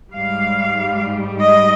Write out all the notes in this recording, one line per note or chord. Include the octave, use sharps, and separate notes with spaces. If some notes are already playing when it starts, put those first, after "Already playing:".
G#2 G3 F5
D#5